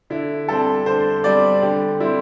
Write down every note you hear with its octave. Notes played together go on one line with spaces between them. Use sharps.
D3 E4
G3 C4 A4
D3 C5
G3 C4 D5
D3 G4
G3 C4 E4